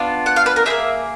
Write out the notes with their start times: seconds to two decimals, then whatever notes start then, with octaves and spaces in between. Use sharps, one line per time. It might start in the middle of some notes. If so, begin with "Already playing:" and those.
Already playing: B3 D4 F4
0.26 F#5
0.36 F5
0.46 B4
0.56 A#4
0.65 D#4 G#4 E5
0.70 A#3